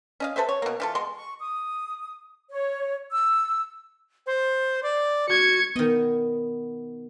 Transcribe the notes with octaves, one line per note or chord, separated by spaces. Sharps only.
C#4 D#5 F5
A4 B4 C5 E5
C#5
B2 A#3
E3 F4 A4
B2 G#3 C6
C#6
D#6
C#5
E6
C5
D5
F#4 G#6 C#7
D#3 B3 D#5